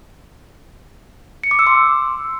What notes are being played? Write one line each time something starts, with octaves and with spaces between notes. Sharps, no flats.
C#7
D6
E6
C6